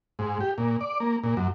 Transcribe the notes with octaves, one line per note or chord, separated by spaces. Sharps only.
G#2
G4
A#2
D5
A#3
A#2
F#2